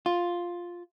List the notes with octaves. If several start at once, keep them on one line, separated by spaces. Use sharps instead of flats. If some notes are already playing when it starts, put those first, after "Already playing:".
F4